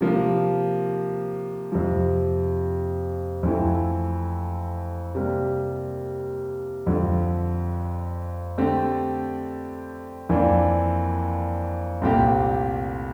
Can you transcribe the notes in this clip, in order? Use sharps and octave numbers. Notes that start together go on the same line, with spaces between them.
C3 F3 A#3
F2 C3 F3
F2 E3 A3 C4 E4
C3 G3 A#3
F2 D3 F3
D3 A3 C4 G4
F2 E3 A#3 D4
C2 A#2 A3 C4 G4